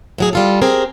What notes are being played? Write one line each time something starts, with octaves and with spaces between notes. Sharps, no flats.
A2 F#3 G#4
G3 F4 A4
C4 G4 G#4 A#4